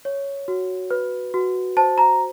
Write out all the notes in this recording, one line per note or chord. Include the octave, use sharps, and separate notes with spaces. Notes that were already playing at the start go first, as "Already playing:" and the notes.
C#5
F#4
B4
F#4
C5 A5
A#5